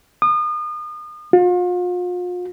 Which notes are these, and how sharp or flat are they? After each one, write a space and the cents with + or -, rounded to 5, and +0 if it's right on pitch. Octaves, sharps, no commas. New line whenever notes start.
D#6 -35
F4 +40